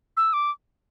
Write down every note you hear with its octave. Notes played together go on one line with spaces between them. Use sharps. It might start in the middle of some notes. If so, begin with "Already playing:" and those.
E6
D6